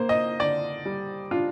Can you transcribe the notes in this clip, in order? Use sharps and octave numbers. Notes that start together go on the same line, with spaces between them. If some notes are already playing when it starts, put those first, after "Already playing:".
Already playing: A#3 C5
D#5
D3 D5
G3
D4 F4